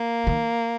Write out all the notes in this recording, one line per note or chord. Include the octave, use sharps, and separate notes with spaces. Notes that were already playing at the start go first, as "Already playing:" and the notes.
Already playing: A#3
D#3